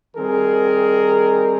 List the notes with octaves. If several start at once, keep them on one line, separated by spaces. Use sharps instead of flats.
D#3 G3 C4 G#4 A#4